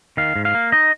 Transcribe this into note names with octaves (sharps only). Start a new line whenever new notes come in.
D#3 F5
G#2
F5
A#3
D#4 D#5